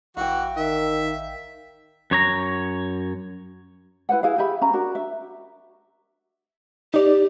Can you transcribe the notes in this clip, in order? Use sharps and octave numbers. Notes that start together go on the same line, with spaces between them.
A1 E3 F#4 F5 G5
D#3 E5
F#2 C#5 A#5
E4 B4 C5 F#5
E4 G#4 F5
G4 G#4 E5 B5
C#4 A#5
D4 F#4 A#4
E5
D#4 G4 D5